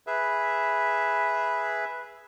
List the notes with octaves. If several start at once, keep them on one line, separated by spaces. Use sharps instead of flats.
G#4 B4 E5